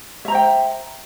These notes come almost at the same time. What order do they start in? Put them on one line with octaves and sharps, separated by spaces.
E5 A#5 C5 G5